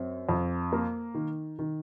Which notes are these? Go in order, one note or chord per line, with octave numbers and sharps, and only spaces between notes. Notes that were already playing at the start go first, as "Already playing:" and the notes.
Already playing: F#2 C4
F2
A#3
D#3
D#3